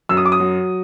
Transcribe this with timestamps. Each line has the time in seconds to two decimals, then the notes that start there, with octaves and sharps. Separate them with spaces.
0.09 F#2 E6
0.17 D#6
0.25 D6
0.32 D#6
0.40 F#3